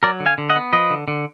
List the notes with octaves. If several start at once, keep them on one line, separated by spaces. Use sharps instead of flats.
F#3 A#4 D5
D3
F5 G#5
D3
D#5 F#5
B3
F3 B4 D#5
D3
D3